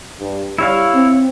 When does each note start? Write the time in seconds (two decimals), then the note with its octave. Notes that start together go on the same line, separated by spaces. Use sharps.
0.20 G2
0.58 G3 E4 C#5 F5
0.94 C4